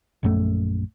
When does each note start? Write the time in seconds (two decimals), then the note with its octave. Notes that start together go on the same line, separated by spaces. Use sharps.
0.23 A#1 F#2 A3